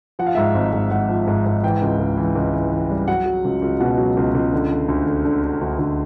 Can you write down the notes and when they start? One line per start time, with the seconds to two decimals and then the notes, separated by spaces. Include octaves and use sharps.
0.19 F3 F#5
0.27 F5
0.35 G#2 E5
0.43 F5
0.54 G#1
0.73 G#2
0.91 G#2 F#5
1.09 F3
1.27 G#2
1.46 G#2
1.63 E3 G5
1.82 C#2
1.99 C#2
2.17 E3
2.35 C#2
2.54 E3
2.72 E3
2.89 G3
3.08 F#3 F#5
3.26 F#3
3.45 C#2
3.62 C#2
3.80 B2 F#5
3.98 F#3
4.17 C#2
4.35 C#2
4.53 D3
4.70 D3
4.88 D2
5.06 D3
5.25 D3
5.44 D3
5.61 D2
5.79 D2